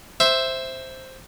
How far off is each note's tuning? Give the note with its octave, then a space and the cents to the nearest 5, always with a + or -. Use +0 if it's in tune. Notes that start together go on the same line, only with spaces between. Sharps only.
C5 +0 E5 +0